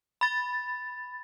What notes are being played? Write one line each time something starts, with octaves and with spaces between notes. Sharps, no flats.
B5 A6